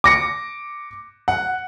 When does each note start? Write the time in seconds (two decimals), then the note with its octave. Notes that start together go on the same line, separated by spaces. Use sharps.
0.04 D6 A#6 C#7
1.28 F#5